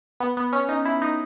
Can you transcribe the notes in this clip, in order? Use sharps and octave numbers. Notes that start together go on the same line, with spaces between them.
B3
B3
C#4
D#4
E4
D#4